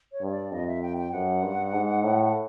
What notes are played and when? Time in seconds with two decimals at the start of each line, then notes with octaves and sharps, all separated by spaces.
0.12 C#5
0.22 G2
0.27 C#5
0.32 D5
0.52 F2 D#5
0.67 E5
0.82 G5
0.97 G5
1.12 F#2 F#5
1.43 G2
1.73 G#2
2.04 A2
2.24 F#5